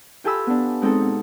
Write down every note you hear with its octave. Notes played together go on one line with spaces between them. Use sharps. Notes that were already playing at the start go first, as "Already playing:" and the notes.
F4 G4 A4 G#5 B5 E6
B3 D4
G#3 C4 D#4 A4
B2